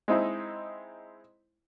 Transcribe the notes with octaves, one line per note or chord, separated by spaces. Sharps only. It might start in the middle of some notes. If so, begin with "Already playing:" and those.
G#3 C4 D#4 E4